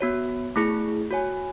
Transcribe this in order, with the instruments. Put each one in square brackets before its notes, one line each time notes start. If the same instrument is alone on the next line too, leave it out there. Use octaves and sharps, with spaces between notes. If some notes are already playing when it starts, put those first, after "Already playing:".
[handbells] B3 F#4 C#5
A3 E4 G#4
F#4 C#5 G#5